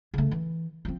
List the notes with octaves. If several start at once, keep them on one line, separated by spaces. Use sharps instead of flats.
C#3 A3
E3
F3 C4